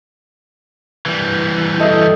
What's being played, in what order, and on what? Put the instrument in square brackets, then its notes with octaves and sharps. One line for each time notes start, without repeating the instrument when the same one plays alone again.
[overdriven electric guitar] E3 G3
[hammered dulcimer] A4 D#5 E5